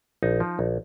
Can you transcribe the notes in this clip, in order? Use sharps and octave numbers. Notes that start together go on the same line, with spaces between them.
A#1 D#4
F3
A#1